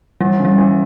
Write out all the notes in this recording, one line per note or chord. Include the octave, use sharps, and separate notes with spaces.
E3 G3
C#3
G3
E3